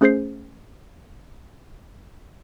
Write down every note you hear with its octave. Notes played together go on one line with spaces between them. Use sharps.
A3 C#4 G#4 C5 G6 C7